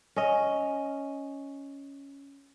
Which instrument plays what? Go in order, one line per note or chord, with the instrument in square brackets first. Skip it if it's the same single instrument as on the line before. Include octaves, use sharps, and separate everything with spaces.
[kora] C#4 D#5